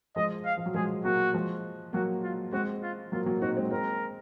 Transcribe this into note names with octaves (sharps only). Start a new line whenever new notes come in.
F3 G#3 D#5
F5
F3
F#3
F3 G#3 G#4
F#3 A#3 F#4
F3 G#3
F#3 A#3 F#4
F4
G#3 C4 F#4
F4
F#3 A#3 F4
F#3 A#3
C4 D#4 F#4
G#3 C4
G#3 C4 A#4